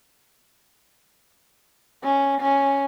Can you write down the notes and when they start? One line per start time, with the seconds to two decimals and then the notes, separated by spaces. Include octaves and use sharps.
2.04 C#4
2.41 C#4